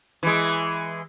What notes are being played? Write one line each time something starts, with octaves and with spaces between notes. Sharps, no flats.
E3 G#3